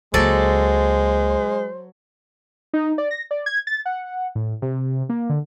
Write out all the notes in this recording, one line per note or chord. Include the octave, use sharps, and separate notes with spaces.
C#2 F#3 G#3 A#3 A4 C5 D5
D#4
D5
A#6
D5
G#6
A6
F#5
A2
C3
A#3
D3